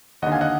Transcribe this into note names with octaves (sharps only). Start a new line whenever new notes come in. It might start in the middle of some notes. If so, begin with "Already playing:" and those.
D#2 D3 D#5 F#5
F5 G#5
D#5 F#5